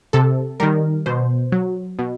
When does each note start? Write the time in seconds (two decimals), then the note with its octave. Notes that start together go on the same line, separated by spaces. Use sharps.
0.13 C3 A4
0.60 D#3 G3 A#4
1.06 B2 C5
1.52 F#3
1.99 B2